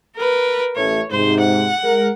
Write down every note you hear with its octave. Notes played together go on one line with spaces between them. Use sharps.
A#4 B4
A1 A3 C#5
G#2 C3 C5
F#5
G#3 A#4